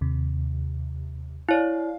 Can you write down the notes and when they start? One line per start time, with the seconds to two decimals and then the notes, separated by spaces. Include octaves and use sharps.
0.01 D#2 C3
1.49 E4 C#5 D5 F5